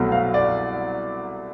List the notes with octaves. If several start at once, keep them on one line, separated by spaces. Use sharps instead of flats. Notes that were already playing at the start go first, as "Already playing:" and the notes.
Already playing: C2 B2 F#3 A3
F5
D5